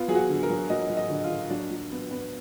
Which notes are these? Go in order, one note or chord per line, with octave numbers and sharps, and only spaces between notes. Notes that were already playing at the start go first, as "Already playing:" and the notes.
Already playing: B3 F4
F#3 G#4
F#4
D3
A#4
F#3
F#3 D#5
F#3
D#5
D3
F4
D3
F#3 D4
F#3
B3
B3